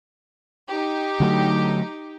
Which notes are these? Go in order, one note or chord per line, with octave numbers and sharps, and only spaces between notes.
D#4 G4
D3 F#3 A3